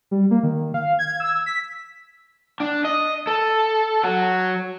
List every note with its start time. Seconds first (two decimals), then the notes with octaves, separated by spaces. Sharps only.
0.11 G3
0.31 A#3
0.43 D#3
0.74 F5
0.99 G#6
1.20 E6
1.46 B6
2.60 D4
2.85 D#5
3.27 A4
4.03 F#3